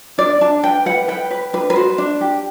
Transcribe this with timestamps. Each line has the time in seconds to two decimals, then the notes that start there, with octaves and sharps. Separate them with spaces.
0.18 D4 D5
0.41 D4 A5
0.63 B4 G5
0.86 B4 F#5
1.08 B4 G5
1.31 B4
1.53 D4 B4
1.70 B4
1.76 F#4 C5
1.98 D4
2.21 G4